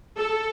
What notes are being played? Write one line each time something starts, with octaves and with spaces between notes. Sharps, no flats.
A4